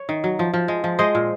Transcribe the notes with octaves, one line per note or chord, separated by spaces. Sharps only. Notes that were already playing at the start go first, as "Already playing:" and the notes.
Already playing: C#5
D#3
F#3
F3
F3
G#3
F3
G#3 C5 D#5
A#2